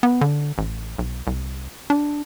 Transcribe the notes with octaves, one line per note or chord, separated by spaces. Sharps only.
B3
D3
A1
B1
C2
D4